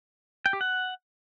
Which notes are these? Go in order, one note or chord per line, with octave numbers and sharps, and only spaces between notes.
G5
G4
F#5